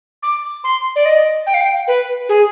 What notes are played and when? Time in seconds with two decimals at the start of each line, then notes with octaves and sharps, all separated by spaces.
0.23 D6
0.64 C6
0.96 D5
1.06 D#5
1.47 G5
1.54 F5
1.61 G5
1.88 B4
2.29 G#4